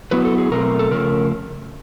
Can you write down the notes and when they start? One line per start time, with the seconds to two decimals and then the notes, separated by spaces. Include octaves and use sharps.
0.11 F#3 B3 E4 B4
0.25 A4
0.38 G#4
0.51 B2 F#3 A3 C4 A#4
0.79 A4
0.91 C#3 F3 A3 C#4 A#4